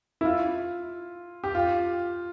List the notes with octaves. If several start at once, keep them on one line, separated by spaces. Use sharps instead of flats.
E4
F4
G4
F4